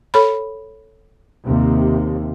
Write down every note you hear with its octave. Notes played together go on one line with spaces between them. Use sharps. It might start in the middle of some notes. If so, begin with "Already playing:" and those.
A4 C#5 B5
D#2 C3